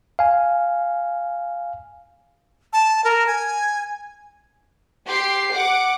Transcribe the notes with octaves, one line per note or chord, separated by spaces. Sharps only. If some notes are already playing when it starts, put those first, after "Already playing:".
F5 G#5
A5
A#4
G#5
G4 C6 C7
F#5 D6